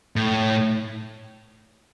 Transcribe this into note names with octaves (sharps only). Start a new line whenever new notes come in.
A2